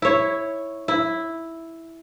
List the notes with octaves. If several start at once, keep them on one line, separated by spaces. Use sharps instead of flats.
E4 C#5
E4